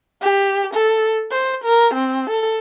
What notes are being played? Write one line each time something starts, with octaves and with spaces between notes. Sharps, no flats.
G4
A4
C5
A#4
C4
A4